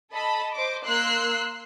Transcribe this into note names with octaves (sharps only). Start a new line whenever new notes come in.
A4 D#5 A5 B5
C5 D#5 D6
A#3 C6 E6 F#6 C7